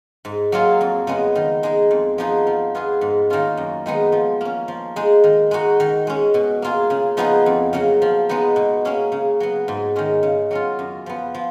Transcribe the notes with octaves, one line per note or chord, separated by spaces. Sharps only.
G#2
F#3 A#3 F4 G#4
F2
C#3 G#3 B3
D#3
G#3 D#4 G#4
F2
F3 B3 D#4 G#4
F3
B3 F4 G#4
G#2
D#3 A#3 C#4 F4
F#2
D#3 G#3 B3 D#4
F3
A#3 C#4
F3
G#3 D#4 G#4
D#3
G#3 D#4 F#4
D#3
G#3 C#4
B2
A#3 F4 G#4
C#3
F3 B3 D#4 G#4
F2
C#3 F#3 A#3
F3
G#3 B3 D#4
B2
A#3 C#4 G#4
C#3
F#3 B3
G#2
D#3 G#3 C#4
C#3
F#3 C#4 F4
F#2
F3 B3
F3